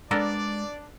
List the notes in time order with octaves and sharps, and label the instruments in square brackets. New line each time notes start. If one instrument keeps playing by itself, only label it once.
[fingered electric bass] G#3 [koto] B3 A4 A#4 [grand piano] D4 [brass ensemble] D5